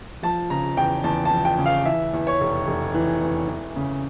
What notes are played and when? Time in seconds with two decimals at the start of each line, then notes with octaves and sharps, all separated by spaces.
0.23 F3 A5
0.50 C#3 A#5
0.77 E2 G5
1.04 E2 A5
1.25 A5
1.31 F3
1.45 G5
1.58 C#3
1.66 F5
1.85 E3 E5
2.14 E2
2.27 C#5
2.41 F1
2.67 F1
2.94 E3
3.22 E2
3.48 E3
3.76 C#3